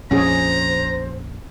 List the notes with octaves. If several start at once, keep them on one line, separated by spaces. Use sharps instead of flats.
A#1 F2 F3 C#4 G#4 C5 A#5